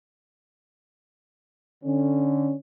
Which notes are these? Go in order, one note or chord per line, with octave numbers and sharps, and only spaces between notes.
D3 C#4